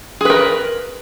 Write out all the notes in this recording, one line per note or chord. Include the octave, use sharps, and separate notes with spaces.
G#4 A#4 B4